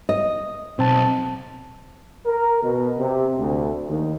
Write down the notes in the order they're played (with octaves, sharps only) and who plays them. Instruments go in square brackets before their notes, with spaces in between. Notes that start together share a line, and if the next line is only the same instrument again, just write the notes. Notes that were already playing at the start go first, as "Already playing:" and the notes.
[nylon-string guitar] D#5
[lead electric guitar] B1 [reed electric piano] C4 A5
[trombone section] A#4
B2
C3
D2
D#2